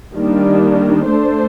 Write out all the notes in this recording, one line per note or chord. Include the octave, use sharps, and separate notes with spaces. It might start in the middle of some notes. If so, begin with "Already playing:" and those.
D#3 G3 A#3 D4
A3 D4 A4 C5